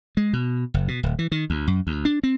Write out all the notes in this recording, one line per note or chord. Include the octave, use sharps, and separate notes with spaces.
G#3
B2
F#1
B2
D1
E3
D#3
D2
F#2
D2
D4
C4